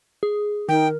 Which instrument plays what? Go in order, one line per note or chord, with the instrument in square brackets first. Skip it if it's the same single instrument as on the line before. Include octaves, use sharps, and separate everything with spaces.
[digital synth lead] G#4
[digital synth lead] D#3 [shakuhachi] D#4 [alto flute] A#4 [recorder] G5